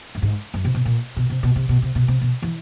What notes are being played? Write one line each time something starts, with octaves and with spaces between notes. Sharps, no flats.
G2
G#2
F#2
C3
B2
A#2
B2
C3
B2
C3
B2
C3
B2
C3
B2
E3